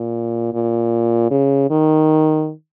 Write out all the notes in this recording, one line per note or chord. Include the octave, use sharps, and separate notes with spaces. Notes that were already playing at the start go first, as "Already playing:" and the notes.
Already playing: A#2
A#2
C#3
D#3